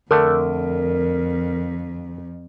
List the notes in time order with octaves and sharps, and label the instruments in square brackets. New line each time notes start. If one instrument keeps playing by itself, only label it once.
[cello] F2 [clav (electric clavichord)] D3 A3 [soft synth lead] A#4